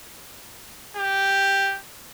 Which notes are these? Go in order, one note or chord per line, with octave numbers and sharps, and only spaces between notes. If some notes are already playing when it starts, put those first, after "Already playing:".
G4